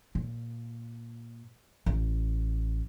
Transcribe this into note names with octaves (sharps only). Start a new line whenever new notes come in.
A#2
A1